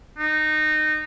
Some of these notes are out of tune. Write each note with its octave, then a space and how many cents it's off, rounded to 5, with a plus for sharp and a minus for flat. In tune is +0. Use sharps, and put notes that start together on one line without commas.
D#4 -20